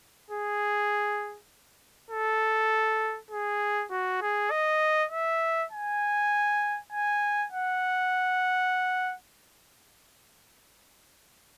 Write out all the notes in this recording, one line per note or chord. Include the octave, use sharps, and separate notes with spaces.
G#4
A4
G#4
F#4
G#4
D#5
E5
G#5
G#5
F#5